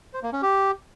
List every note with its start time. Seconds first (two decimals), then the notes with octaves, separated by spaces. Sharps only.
0.14 C5
0.23 A#3
0.33 C#4
0.42 G4